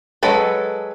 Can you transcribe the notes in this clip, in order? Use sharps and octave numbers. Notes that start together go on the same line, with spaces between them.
F#3 G#3 A4 B4